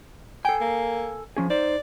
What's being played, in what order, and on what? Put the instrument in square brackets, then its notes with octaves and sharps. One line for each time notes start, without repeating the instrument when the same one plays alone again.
[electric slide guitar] A4 G#5 [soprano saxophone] G5
[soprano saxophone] A#3
[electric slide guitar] F3 C#4 G#4
[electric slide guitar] D#4 C5 [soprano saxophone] D5